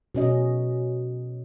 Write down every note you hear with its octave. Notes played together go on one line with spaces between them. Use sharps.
B2 C#4 D#5